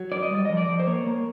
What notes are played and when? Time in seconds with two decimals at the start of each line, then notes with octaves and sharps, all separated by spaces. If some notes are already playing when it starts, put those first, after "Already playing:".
Already playing: F#3
0.12 F#2 D5
0.23 D#5
0.31 G3 D5
0.45 F3 D#5
0.57 D5
0.68 F3
0.79 C5
0.87 A#3 C#5
1.07 A#3